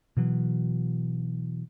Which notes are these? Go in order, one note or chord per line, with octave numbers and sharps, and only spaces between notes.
B2 E3 F#3